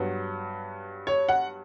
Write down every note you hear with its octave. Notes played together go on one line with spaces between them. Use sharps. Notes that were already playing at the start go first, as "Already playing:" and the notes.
Already playing: G2 F#3 B3
C#5
F#5